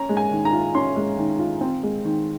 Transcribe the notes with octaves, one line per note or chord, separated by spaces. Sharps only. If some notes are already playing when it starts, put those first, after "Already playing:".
Already playing: C#4 A#5
G#3
G#5
D#3
A#5
F4
C#4 C6
G#3
D#3
F4
C4
G#3
D#3